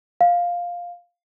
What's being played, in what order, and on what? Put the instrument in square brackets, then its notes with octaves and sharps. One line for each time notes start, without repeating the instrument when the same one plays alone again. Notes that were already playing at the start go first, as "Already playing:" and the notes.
[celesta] F5